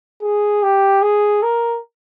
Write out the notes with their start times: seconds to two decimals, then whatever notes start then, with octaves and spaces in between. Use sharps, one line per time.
0.22 G#4
0.63 G4
1.02 G#4
1.43 A#4